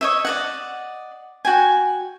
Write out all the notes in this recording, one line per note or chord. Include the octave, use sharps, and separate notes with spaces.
C#5 D#5 E5
D5 D#5 F#5
F#4 G5 G#5